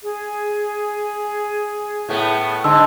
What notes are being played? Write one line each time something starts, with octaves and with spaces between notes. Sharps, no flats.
G#4
A2 A3 B3
G#2 D3 D#5 A5 C6 E6